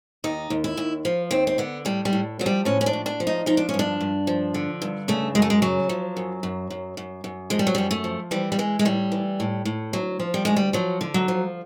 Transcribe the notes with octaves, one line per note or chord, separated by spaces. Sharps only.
D#2 D#4
D#2
E4
D#2
F3
D#2 C4
C4
D3 B3
A2 G3
G3
A2
F3 F#3
G3
A2 C#4
C#4
D4
A2
D4
F3
D#4
F3 D#4
D4
C#4
G2
D4
G2
F3
D3
G2
C#3 A3
F#2 G#3
A3
G#3
C#3 F#3
F3
F#2
F#2
F#2
F#2
F#2
F3 G#3
G3
F#3
F#2 G3
A3
F3
E3 G3
G3
E3 G#3
G#3
A2 G3
E3
A2
A2
D2 F#3
F3
G3
D2 G#3
G3
F3 F#3
D3
F#3
F3